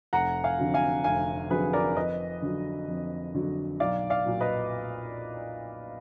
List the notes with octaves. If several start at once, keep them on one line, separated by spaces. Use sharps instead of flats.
F1 F#5 A#5
F5 G#5
F2 D3 F#3
F5 G#5
F1 F5 G#5
F2 D3 F#3 G#4 B4
A#4 D5
F2 B4 D#5
D3 F#3
F2
D3 F#3
B1 D5 F5
D5 F5
A#2 F#3
B4 D#5